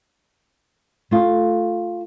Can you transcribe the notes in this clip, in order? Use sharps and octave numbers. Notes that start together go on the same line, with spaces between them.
A3 F4